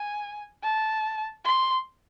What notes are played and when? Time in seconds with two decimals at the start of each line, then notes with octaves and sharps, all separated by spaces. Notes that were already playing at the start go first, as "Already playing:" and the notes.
Already playing: G#5
0.64 A5
1.45 C6